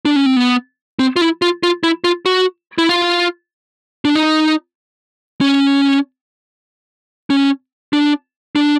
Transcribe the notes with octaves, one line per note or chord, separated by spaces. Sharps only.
D4
C#4
C4
B3
C4
F4
E4
F4
F4
E4
F4
F#4
E4
F4
D4
D#4
C#4
C#4
D4
D4